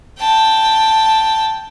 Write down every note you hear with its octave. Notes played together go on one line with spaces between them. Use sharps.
G5 A5